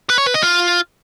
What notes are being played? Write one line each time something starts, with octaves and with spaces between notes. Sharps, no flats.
B4
C#5
B4
D#5
F4